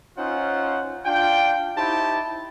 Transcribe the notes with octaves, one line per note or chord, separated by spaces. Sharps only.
C#4 D#4 F4 C5 F#5
D4 F4 G5
D#4 E4 G4 C5 A5